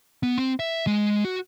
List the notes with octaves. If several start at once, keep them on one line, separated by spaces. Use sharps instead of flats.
B3
C4
E5
G#3
F#4